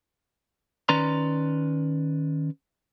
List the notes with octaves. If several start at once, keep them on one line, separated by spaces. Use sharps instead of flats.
D#3 C#4 B4 D5 A#5 C6